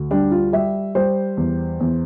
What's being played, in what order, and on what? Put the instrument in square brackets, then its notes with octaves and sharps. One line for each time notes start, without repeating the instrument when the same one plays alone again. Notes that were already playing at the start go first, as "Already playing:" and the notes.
Already playing: [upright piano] D2
G3 D4
F4
G3 E5
G3 C5
E2
E2